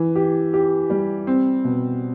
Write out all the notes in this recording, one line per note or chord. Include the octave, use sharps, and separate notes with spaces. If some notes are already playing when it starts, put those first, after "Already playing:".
Already playing: E3
G4
G4
G3
C4
B2